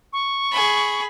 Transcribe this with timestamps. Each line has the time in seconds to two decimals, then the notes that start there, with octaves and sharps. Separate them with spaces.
0.13 C#6
0.52 G#4 B5